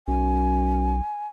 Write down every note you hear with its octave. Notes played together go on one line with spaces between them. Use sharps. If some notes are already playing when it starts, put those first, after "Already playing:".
B1 F#2 G#5